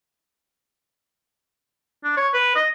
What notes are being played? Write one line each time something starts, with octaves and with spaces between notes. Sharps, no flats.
D4
C#5
B4
D#5